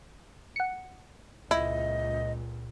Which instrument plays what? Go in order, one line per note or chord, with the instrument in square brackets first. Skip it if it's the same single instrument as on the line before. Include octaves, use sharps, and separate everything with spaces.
[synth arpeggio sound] F#5 C#7
[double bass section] C#2 A#2 [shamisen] E4 [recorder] D#5